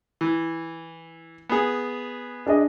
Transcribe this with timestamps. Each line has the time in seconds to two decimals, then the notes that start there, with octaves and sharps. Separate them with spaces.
0.21 E3
1.49 B3 G#4
2.47 D4 G#4 D#5